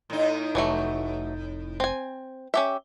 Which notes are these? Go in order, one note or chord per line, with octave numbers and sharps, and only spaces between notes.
A2 D#4
F1 E3 F#3 A3
C4 G#5
C#4 G4 E5